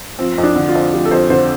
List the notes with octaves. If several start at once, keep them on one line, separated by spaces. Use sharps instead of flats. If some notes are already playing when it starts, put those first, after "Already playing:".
F3 C4
F2
D4
D3
F4
F2
F3 G4
A4
F2 C5
D3 C5